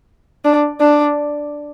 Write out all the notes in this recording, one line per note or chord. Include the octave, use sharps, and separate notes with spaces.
D4
D4